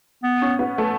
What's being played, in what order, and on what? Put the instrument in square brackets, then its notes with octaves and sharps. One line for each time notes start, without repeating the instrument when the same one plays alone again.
[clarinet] B3
[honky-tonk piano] C#4
B3
A3